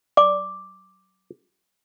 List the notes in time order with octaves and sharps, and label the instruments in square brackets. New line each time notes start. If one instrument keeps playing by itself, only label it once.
[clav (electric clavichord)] D5 [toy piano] D6